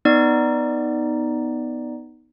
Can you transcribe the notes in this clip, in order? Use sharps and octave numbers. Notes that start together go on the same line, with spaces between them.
B3 D#4 D5